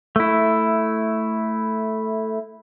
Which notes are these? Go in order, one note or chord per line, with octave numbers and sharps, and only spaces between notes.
A3 E4